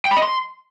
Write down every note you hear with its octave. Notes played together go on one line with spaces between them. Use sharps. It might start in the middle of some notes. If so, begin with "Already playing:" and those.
G5
B5
D#5
C6